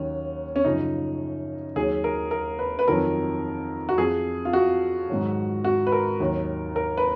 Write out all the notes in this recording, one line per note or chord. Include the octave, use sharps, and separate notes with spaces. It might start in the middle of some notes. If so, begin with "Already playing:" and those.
Already playing: D#2 D#3 F#3 C#4
C#4
F#2 C#3 F3 D#4
D#2 D#3 F#3 G#4
A#4
A#4
B4
B4
F2 D#3 F#3 A#4
F#4
F2 F3 G#4
F4
F#4
G#2 D#3 F#3
F#4
B4
A#4
D#2 D#3 F#3
A#4
B4